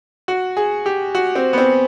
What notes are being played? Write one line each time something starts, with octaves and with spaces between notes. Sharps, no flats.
F#4
G#4
G4
F#4
C4
B3
C4